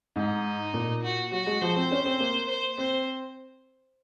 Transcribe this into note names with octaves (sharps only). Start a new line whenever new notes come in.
G#2 D#4
A#2
F#4
F#3 F#4
G#3
F3 C5
C4
C#4
C4
A#3
C5
C4 C5